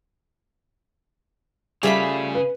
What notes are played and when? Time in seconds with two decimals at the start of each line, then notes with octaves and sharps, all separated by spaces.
1.83 C#3 G3 A3 F4 G#4 E5 B5
2.35 B4